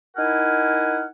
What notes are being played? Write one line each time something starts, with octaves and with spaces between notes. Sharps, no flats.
D#4 E4 A#4 F#5 G#5 F6